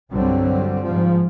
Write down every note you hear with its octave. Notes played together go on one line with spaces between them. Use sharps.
C2 G2 D3 F#3 G3 C4
G#2 F3